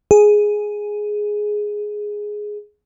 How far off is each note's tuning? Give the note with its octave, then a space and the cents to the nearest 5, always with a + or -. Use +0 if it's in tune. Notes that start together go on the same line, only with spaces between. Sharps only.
G#4 +5